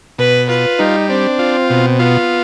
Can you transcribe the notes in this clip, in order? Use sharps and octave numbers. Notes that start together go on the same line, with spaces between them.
B2 B4
F4 B4
G3 D#4
C4 D4
F4
B2
B3 F4